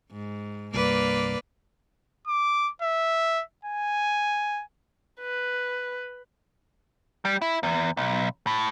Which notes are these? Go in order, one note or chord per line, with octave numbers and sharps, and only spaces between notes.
G#2
C2 G2 A#3 B4 D5
D6
E5
G#5
B4
G3
E4
E2
B1
A2